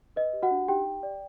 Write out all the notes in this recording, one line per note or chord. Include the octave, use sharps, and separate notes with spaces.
B4 D#5
G4
F#4 F#5
D4
D#4 G4 G5
G4
D5